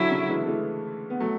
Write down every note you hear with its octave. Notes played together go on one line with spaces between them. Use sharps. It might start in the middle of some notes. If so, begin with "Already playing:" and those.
Already playing: D3 F#3 E4
C#3
E3 G#3
A3
E3 G#3
B3
F#3 A3